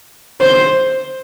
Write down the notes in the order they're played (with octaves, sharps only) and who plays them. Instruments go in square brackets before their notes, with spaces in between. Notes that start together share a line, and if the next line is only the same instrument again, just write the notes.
[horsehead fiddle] C5